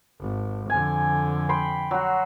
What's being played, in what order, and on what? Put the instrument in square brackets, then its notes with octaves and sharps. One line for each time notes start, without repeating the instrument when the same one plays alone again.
[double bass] G#1
[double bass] F2 D3 [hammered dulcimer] G#5
[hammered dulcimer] G5 B5 C6
F#3 F#4